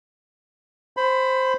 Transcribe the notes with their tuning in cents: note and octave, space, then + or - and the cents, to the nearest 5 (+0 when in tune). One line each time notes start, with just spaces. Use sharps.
C5 +0 B5 +20